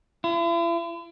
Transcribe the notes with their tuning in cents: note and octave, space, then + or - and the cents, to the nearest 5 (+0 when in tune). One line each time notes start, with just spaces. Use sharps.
E4 +45